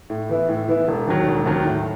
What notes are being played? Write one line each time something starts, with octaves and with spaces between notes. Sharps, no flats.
A2
E3 B3 E4
A2
E3 B3 E4
E1
D#2 D#3 F#3
E1
D#2 D#3 F#3
A2